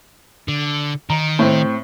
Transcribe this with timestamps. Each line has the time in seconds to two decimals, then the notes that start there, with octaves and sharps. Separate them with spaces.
0.48 D3
1.10 D#3 A#5
1.39 A2 C4